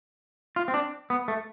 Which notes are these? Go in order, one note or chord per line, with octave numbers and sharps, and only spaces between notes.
F4
C4
D4
B3
A3